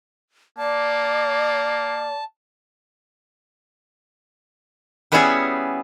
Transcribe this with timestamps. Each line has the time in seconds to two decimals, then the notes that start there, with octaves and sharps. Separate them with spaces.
0.58 A#3 D5 A5
5.12 G3 B3 C#4 E4 F#4 G#4